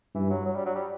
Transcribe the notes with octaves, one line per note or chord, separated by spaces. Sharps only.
G2 E3
F#3
F#3
G3
F#3
G3